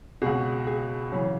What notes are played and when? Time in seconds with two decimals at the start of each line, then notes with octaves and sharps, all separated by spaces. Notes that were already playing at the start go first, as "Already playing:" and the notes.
0.22 C#2 B2 G#4
0.67 G#4
1.12 F#2 C#3 E3 C#4